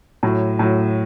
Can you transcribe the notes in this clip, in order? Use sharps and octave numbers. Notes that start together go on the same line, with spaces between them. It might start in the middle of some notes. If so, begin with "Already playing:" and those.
A2 F#3
A2 F#3